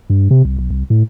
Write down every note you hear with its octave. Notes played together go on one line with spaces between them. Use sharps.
G2
C3
C2
B1
C2
A2